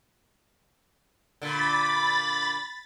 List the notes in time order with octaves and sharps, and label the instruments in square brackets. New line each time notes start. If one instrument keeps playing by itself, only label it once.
[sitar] A#2 D3 [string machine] B5 A6